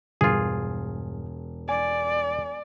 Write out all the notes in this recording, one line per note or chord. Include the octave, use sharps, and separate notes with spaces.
E1 G2 F4 G#4
D5 G#5